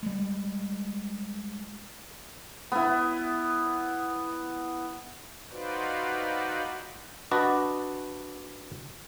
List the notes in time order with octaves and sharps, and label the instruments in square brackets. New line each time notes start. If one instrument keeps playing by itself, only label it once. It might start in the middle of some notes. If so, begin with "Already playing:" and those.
[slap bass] G3 G#3
[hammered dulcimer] B3 E4
[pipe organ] D#4 F4 F#4 B4 C5 D5
[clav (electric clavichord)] D4 F#4 B4 D5 D#5